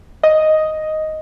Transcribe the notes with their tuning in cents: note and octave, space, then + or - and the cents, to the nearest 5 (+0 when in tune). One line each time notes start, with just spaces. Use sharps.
D#5 +0